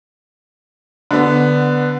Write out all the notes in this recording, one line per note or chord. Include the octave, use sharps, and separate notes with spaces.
D3 B3